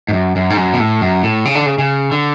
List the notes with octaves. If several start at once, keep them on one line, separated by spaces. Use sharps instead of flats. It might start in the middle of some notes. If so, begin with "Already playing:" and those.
G#2
F#2
F#2
G#2
F#2
B2
A2
F#2
A2
C#3
D3
C#3
C#3
D3